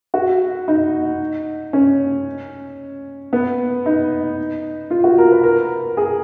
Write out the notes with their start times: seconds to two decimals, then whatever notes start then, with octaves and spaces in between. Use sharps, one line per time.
0.14 F#4
0.68 D#4
1.73 C#4
3.33 B3
3.86 D#4
4.91 F4
5.04 F#4
5.18 A#4
5.31 B4
5.44 A#4
5.97 G#4